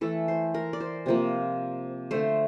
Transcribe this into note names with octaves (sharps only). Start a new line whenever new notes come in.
E3 A3 A4
C5
A#4
D5
C5
C3 F3 A#3
D3 A3 C5